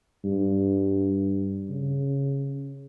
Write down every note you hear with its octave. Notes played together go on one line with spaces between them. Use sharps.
G2
C#3